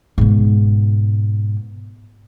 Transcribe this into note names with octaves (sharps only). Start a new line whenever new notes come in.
G#2 B2